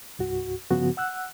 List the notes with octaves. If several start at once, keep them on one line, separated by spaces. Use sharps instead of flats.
C2 G2 F#4
G2 C#3 F3 B3 F#4
F#5 E6 F#6